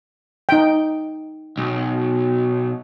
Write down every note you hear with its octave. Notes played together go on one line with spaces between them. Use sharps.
D#4 G5
B1